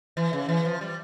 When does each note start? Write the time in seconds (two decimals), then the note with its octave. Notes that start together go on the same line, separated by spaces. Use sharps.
0.17 E3
0.33 C#3
0.49 E3
0.65 F3
0.81 G3